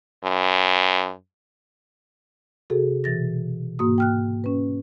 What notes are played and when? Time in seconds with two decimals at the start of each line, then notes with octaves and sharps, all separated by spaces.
0.24 F#2
2.70 C3 F#4 G#4 A4
3.04 B2 E3 A6 A#6
3.79 G#2 A#3 F#4 D#6
3.98 G5 F6 F#6
4.44 C#4 B4